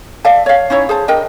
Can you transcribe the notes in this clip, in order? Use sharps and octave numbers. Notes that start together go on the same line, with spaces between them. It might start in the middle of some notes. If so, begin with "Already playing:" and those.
D5 E5 F5 A5
C#5 F5
C#4 D#4 E4 C#5
G#4 C5 A5
D4 A#4 D#5 G5